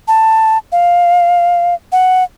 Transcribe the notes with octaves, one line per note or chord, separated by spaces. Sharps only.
A5
F5
F#5